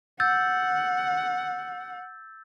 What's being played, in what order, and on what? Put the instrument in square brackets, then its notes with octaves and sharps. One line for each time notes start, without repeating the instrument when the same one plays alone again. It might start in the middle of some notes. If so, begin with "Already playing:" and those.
[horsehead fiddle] F#5 [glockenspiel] E6 G6 A6